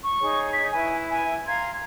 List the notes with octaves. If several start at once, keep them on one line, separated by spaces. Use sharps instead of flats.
C#6
D#4 G#4 C#5
B6
E4 B4 G#5
G#5
F5 A#5 C6 G#6